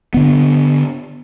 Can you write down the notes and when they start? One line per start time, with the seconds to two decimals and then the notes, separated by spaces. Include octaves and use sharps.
0.14 D3 B3